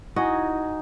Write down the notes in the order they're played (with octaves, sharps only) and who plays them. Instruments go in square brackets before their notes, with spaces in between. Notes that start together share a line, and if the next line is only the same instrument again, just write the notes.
[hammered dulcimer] D#4 G#5 [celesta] E4 [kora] F#4 D#5